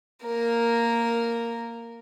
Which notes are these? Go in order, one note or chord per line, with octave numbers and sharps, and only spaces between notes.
A#3 A#4